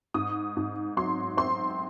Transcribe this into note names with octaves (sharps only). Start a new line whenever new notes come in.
G#2 D#6
G#2
F#3 C6
C4 C6